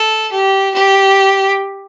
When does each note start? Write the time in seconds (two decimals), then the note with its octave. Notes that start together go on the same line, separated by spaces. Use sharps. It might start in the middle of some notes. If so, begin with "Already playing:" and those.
Already playing: A4
0.31 G4
0.74 G4